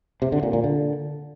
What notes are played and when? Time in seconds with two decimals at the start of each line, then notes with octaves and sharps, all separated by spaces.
0.22 C3
0.32 D3
0.43 A#2
0.53 A#2
0.64 D3